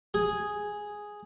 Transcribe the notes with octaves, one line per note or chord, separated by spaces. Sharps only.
G#4